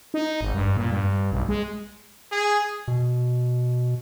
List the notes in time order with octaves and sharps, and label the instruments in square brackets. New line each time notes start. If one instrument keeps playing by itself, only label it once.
[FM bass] D#4
G#1
G2
A#2
G2
B1
G#3
[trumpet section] G#4
[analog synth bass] B2